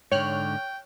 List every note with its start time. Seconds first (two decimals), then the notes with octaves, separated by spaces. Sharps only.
0.12 G#2 D3 C#5 G5 F6 F#6